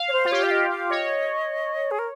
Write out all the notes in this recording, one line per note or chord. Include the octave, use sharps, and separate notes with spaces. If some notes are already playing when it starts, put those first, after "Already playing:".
Already playing: F5
C#5
C5
F4
G4 C#5
F5
D#5
F5
C#5 D#5
G#4
A#4